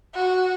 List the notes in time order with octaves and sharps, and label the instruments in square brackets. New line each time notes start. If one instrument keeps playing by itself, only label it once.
[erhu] F#4